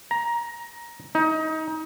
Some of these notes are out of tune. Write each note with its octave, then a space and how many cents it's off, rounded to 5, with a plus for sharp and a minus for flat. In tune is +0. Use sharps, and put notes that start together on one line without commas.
A#5 +15
D#4 +25